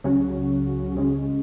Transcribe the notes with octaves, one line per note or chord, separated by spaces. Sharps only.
C#2 C#3 F#3 C#4 F#4
C#2 C#3 G#3 C#4